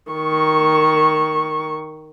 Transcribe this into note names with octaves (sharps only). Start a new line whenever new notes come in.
D#3 C#6